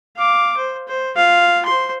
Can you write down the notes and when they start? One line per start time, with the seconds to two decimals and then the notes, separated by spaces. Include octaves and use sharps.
0.16 F5 D6
0.57 C5
0.88 C5
1.16 F4 F5
1.65 C5 C6